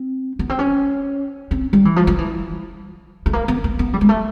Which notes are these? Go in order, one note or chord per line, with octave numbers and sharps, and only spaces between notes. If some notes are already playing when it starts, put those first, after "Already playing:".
Already playing: C4
B3
C4
C#4
C4
G3
E3
F3
F3
E3
A3
A#3
B3
A#3
B3
G3
G#3
A3